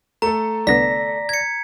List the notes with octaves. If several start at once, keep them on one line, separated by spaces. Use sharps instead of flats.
A3 A4 A#5
C2 D3 B3 D5 A#6 B6
G#6 C#7